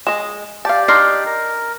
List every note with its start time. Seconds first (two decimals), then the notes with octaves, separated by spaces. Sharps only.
0.07 G#3 D#5 E7
0.65 G4 D5 F5 A5
0.88 D4 D#4 A#5 C6 F6 C7
1.26 A#4